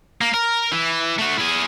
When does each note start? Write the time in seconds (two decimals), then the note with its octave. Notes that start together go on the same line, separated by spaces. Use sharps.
0.21 A#3
0.34 A#4
0.72 E3
1.19 A3 F#4
1.38 E4 G#4